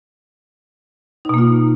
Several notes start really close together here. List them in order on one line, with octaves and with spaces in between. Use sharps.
D#4 B2 A#3 F4